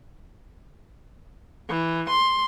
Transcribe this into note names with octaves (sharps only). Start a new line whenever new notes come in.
E3
C6